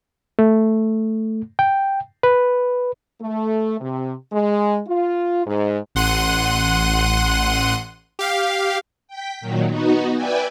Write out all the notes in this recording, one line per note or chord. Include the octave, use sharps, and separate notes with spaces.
A3
G5
B4
A3
C3
G#3
F4
G#2
A1 F#5 C6 F#6 D#7
G4 F5
G5 B6
A#2 D#3 F#3
B3 D#4 F#4
B4 D5 E5 G5 G#5